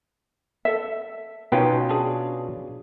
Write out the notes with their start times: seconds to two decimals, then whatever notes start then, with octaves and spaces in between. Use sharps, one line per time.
0.65 A4 E5
1.52 B2 C#4 D#4 F4 B4 G5
1.89 D4 G#4